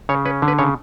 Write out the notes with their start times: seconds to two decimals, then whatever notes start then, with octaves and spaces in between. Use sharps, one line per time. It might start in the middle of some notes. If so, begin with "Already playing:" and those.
0.09 C#3 C#5
0.25 C#4 B4
0.42 D3
0.48 B4
0.58 C#3 C#5